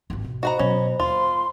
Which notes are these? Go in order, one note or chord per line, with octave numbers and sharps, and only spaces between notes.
G#1 D#2
B2
F#4 C5 D#5 F#5 A#5 B5
B2 F#3 C#4
D#2 F4 C6